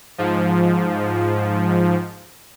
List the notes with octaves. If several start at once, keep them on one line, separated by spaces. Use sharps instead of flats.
G#2 F3